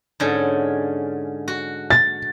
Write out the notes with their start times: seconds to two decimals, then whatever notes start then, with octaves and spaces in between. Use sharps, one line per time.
0.20 G#2 D3 C#4
1.48 F#4
1.90 A6